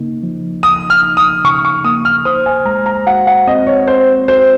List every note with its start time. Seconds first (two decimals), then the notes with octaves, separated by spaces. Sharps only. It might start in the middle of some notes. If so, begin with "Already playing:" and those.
Already playing: C#3 A#3 D#4
0.23 F3
0.63 D#4 D#6
0.90 F6
1.03 D#4
1.17 D#6
1.44 C#3 C#6
1.65 C#6
1.84 A#3 D#6
2.05 F6
2.25 C5 D#6
2.46 G#5
2.65 G#3 A#5
2.86 A#5
3.07 F#4 F#5
3.27 F#5
3.47 C4 D#5
3.67 C#5
3.87 C4 C5
4.28 F#4 C5